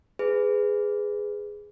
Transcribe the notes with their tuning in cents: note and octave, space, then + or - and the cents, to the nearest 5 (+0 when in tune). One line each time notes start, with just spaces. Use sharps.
G#4 +0 B4 +20